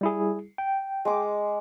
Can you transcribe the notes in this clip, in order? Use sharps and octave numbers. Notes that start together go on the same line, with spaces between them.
G3 E4 G#4
G5
G#3 D6